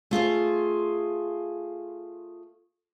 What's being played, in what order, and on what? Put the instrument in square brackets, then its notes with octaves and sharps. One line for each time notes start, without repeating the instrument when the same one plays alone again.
[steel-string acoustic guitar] A3 F4 G#4 C5